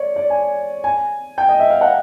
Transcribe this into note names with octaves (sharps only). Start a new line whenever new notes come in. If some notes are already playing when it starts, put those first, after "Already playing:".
Already playing: C#5 D5
D5
G#5
G#5
G5
D#5
E5
F5
F#5